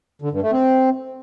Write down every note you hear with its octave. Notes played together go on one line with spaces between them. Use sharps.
D3
G2
A3
C4